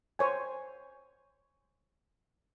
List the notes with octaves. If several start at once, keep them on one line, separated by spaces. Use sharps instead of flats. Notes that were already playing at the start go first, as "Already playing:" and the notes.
C5 C#5 G#5